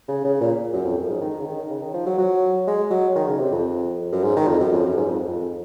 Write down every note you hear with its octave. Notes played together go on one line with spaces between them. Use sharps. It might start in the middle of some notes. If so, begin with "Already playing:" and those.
C#3
C#3
A#2
F#2
F2
F#2
G#2
D#3
C#3
D#3
C#3
D#3
F3
F#3
F#3
G#3
F#3
D#3
C#3
C3
F2
F#2
G#2
D#3
F2
F#2
F2
F#2
G#2
F2
F2